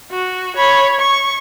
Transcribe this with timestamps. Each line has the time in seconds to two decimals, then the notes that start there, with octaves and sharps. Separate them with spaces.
0.11 F#4
0.56 C#5 B5
0.99 C#6